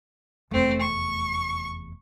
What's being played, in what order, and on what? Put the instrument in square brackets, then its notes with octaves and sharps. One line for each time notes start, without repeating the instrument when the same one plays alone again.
[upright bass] F1 E2 [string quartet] A3 C4
[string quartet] C#6